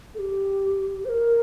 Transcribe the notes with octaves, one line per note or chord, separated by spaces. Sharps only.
A4
G4
C5
A#4